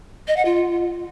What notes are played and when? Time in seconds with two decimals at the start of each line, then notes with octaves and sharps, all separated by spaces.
0.28 D#5
0.37 F#5
0.45 F4